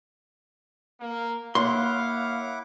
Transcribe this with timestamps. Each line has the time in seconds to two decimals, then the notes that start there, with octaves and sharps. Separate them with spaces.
1.00 A#3
1.55 A#3 E4 C#5 F5 F#5 C6 D6